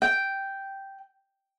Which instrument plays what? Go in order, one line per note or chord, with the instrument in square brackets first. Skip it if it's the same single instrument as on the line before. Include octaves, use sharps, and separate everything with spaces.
[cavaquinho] G5